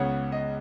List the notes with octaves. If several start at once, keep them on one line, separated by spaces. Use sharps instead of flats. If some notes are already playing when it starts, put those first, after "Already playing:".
Already playing: C#2 C#3 B3 C#5 F#5
D#5